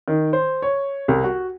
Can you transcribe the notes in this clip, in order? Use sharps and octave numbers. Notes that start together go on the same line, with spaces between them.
D#3
C5
C#5
C2
F#4